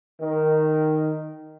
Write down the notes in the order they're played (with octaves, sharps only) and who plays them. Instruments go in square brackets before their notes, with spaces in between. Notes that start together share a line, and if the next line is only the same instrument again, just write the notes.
[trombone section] D#3